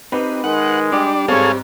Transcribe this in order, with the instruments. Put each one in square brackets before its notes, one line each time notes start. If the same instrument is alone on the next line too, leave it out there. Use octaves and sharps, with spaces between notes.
[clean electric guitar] C4 D#4 G4 [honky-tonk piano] B4
[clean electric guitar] D#3 [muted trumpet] G#3 [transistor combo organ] F#5
[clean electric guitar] G3 G4 [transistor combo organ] D4
[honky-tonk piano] G#2 C4 [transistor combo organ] G#4 A4 F5 [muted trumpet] C#5